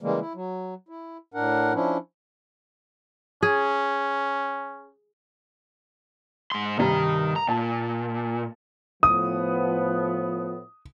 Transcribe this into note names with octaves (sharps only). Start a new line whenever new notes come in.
C#3 E3 G3 G#3 A#3
E4
F#3
E4
A2 D4 A#4 F#5
F3 C#4 D4 E4
C#4 G#4
G#2 C6
G2 C3 D#3 G3 A#5
A#5
A#2 A5
A2 F3 B3 D#6